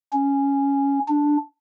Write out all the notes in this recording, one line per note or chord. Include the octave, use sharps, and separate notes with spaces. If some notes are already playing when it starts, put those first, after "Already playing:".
C#4
D4